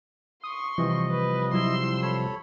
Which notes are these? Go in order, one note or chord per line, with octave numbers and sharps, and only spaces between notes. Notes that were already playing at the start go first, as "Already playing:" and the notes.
C6 C#6 D#6
C3 E3 F3 G3 D#5
B4
F#3 E4 C6 E6
A4 C#5 B5